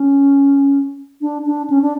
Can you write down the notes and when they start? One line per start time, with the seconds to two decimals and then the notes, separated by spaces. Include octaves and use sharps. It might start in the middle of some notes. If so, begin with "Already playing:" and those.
Already playing: C#4
1.21 D4
1.46 D4
1.70 C#4
1.82 D4